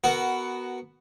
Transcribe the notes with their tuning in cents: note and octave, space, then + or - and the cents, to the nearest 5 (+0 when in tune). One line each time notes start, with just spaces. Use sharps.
B3 +0 F#4 +10 A#4 -15